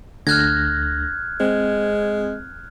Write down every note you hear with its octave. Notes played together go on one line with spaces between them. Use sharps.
D2 D3 F6 F#6 G#6 A#6
G#3 C4